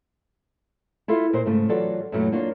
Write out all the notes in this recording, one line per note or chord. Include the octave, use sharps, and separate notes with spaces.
E4 F4 A4 E5 F5
A#2 A#4 C5
G#2 C#3 A3
E3 F#3 F4 F#4 A4 D5
F#2 A#2 E3 F#3 A3
A#3 D4 F4 C#5